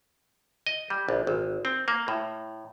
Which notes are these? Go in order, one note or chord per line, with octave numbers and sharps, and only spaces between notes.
D#5
G3
A#1
G#1
C4
A#3
A2